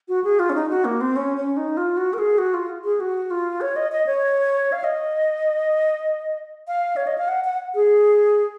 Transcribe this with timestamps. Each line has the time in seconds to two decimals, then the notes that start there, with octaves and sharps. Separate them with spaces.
0.08 F#4
0.24 G#4
0.39 F4
0.50 C#4
0.55 D#4
0.70 F#4
0.85 A#3
1.01 C4
1.16 C#4
1.37 C#4
1.57 D#4
1.77 F4
1.97 F#4
2.13 A#4
2.18 G#4
2.38 F#4
2.54 F4
2.84 G#4
3.00 F#4
3.31 F4
3.61 C#5
3.76 D#5
3.92 D#5
4.06 C#5
4.72 F5
4.84 D#5
6.68 F5
6.96 C#5
7.07 D#5
7.18 F5
7.28 F#5
7.44 F#5
7.75 G#4